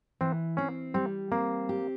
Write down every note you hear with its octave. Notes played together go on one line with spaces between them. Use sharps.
E3 C4
C4 C#4
G3 C4
A#3 C4
G4